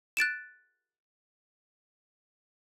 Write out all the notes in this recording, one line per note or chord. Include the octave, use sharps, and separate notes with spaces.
F#6 A6 D7 E7